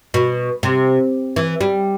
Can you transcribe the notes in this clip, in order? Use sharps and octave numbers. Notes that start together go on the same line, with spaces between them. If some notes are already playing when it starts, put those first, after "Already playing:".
B2
C3
E3
G3